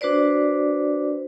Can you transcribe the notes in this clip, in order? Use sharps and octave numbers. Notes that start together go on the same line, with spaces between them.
D4 F#4 B4 C5 D5